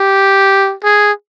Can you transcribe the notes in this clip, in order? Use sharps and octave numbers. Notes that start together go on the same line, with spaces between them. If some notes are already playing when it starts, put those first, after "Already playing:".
Already playing: G4
G#4